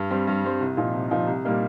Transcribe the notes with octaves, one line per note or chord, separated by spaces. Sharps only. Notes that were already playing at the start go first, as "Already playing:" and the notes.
Already playing: G2
G3 C4
G2
G3 C4
C2
A#2 F3 D#4
C2
A#2 F3 D#4
C2
A#2 G3 A#3 D#4